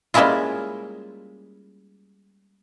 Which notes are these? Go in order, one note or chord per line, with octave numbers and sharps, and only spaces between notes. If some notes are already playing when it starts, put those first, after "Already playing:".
G3 G#3 A#3 C#4 E4 F4